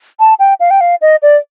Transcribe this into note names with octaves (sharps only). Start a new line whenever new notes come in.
A5
G5
F5
G5
F5
D#5
D5